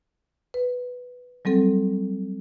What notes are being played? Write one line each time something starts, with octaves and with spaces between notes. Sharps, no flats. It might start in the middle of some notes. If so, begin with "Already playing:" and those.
B4
F#3 G3 C4 A4